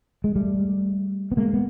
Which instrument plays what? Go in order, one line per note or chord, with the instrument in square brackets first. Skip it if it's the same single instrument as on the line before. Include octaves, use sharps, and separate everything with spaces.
[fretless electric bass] G#3
G3 A3
B3
G#3 A#3
B3